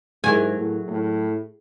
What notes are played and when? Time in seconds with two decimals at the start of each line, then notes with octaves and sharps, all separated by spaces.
0.24 G#2 F#3 E4 G4 G#4 A#4 G#5
0.57 A2
0.88 A2